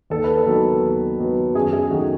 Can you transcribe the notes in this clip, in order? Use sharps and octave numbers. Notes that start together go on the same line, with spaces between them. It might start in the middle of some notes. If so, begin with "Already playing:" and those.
D#2 A4
B4
A4
D#3 F#3 B3
D#2
D#3 F#3 B3
F#2 G#4
G#4
D#3 F#3 A3 F#4